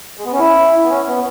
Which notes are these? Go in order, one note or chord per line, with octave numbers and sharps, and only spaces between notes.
G#3
B3
C#4
E4
B3
C#4
B3